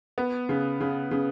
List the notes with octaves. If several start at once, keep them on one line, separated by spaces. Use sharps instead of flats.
B3
C#3
C#3
C#3